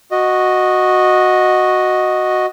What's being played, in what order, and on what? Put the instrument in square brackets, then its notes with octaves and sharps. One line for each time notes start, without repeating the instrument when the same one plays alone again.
[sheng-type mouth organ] F#4 D#5